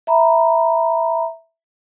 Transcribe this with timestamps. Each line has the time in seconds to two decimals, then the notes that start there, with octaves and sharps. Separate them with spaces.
0.07 E5 A#5 B5